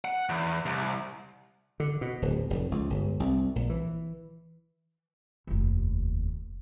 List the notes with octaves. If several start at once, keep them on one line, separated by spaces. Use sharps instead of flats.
F#5
E2
C2
D3
B2
D1
F1
C#2
G1
C2
A#1
E3
F1 D#2